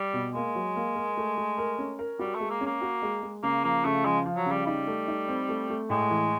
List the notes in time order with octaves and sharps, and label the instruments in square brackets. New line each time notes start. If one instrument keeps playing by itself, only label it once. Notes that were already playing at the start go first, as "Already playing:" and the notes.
Already playing: [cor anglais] G3
[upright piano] B2
[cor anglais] G#3 [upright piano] A#3
[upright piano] F#3
A#3
A#4
A3
A3
A#4
C#4
A#4
[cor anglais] G3 [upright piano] F#4
[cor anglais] A3
[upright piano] G#3
[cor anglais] A#3
[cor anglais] A#3 [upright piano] C#4
[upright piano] F#4
G#3
G#3
[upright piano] C#3 [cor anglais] A#3
[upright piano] F3 [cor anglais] A#3
[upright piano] C#3 [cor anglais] A3
[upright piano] F3 [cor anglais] G#3
[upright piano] F3
[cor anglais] F#3
[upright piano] C#3 [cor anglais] G3
[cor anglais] G3 [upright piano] D#4
[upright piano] A3
D#4
C4
A3
A3
[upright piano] A2 [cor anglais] G#3
[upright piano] E3